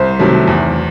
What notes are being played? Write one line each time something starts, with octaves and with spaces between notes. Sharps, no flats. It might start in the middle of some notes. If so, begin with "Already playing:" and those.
Already playing: C2 C5
C3 D#3 F#3 A3
E2